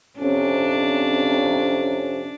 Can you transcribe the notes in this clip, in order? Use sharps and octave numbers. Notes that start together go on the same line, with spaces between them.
F2 C3 C#4 D4